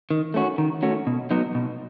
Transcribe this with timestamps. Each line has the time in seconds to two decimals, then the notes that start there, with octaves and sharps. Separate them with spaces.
0.11 D#3
0.34 A3 C#4 F#4
0.58 D#3
0.83 A3 C#4 F#4
1.07 B2
1.31 F#3 B3 D#4
1.55 B2